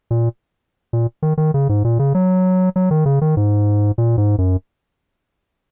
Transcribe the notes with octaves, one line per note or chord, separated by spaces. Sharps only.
A#2
A#2
D#3
D#3
C#3
G#2
A#2
C#3
F#3
F#3
D#3
C#3
D#3
G#2
A#2
G#2
F#2